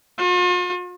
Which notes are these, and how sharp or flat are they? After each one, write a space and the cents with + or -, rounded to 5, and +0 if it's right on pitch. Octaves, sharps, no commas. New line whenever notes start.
F4 +45